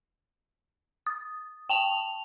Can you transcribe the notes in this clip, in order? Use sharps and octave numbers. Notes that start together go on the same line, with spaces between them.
D#6
G5 A5 F7